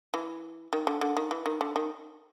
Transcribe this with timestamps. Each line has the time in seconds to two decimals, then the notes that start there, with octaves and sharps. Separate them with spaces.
0.14 E3
0.73 D#3
0.87 D3
1.01 D3
1.17 D#3
1.31 E3
1.46 D#3
1.61 D3
1.76 D#3